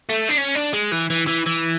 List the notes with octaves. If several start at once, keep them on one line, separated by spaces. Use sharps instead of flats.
A3
D4
C#4
D4
G#3
E3
E3
E3
E3